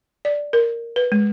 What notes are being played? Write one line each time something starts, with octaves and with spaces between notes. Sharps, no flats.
D5
A#4
B4
G#3